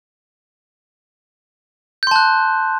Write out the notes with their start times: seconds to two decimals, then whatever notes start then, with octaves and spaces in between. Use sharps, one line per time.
2.03 G6
2.07 C6
2.11 A5
2.16 F#6